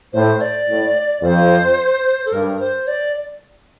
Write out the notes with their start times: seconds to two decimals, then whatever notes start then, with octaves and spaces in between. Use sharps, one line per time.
0.13 A2 C5
0.41 D5
0.69 A2
1.22 F2 C5
2.26 A4
2.33 G2 A#4
2.60 C5
2.87 D5